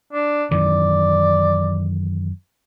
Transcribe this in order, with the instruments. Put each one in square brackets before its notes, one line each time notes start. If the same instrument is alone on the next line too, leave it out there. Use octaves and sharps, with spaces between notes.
[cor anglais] D4
[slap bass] F#2 D#3 E3 [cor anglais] D5